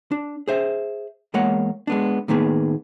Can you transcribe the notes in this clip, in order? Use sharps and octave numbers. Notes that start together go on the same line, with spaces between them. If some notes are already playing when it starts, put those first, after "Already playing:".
D4
G#4 C5 E5
E2 G#3 A#3 C#5 F#5
G#3 B3 D4
A2 D#3 A#3 B3 G#4